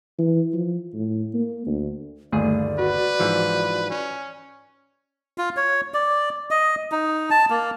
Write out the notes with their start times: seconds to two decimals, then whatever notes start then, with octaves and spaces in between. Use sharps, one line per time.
0.18 E3
0.54 F3
0.94 A2
1.34 A#3
1.66 D2
2.32 G1 D#2 A3 G#4 D5
2.79 F#4 B4
3.20 G#2 E3 F3
3.90 C#4
5.38 F4
5.57 C#5
5.94 D5
6.51 D#5
6.92 D#4
7.31 A5
7.50 A#3